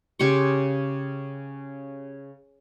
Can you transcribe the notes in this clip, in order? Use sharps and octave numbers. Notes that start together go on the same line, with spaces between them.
C#3 G4 C6 C#6